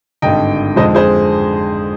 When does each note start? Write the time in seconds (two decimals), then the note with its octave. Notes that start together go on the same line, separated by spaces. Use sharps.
0.22 G#1 G2 D3 D#5 G5
0.76 F2 D3 G#3 C5 D#5
0.95 G#4 C5